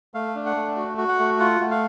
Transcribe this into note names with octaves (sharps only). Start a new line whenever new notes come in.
A3 F5
D4
F#5
A3
F#4
F#4
F#5
A3
F4 F#5
A3
F5